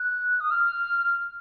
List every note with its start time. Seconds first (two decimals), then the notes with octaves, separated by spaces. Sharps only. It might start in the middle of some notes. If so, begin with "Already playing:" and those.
Already playing: F#6
0.40 D#6
0.51 F6